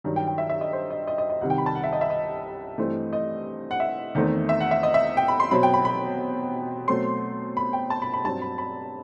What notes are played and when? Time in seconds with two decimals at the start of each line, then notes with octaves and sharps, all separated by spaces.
0.04 G2 D#3 F#3
0.16 G5
0.27 G5
0.38 E5
0.50 E5
0.61 D#5
0.73 C5
0.90 D#5
1.07 D#5
1.18 D#5
1.30 D#5
1.41 C2 C3 D#3 F#5
1.50 G5
1.58 B5
1.66 A5
1.75 F#5
1.84 E5
1.93 D#5
2.01 E5
2.10 D#5
2.78 G2 E3 A3 C4
3.13 D#5
3.71 F#5
3.80 E5
4.15 E2 D#3 A3 C4
4.49 E5
4.60 F#5
4.71 E5
4.83 D#5
4.94 E5
5.17 G5
5.28 B5
5.40 C6
5.51 B2 F#3 C4 B5
5.63 G5
5.74 B5
5.85 B5
6.88 B2 F#3 A3 C4 C6
7.57 B5
7.73 G5
7.90 A5
8.02 B5
8.14 B5
8.24 G2 F#3 C4 A5
8.42 B5
8.58 B5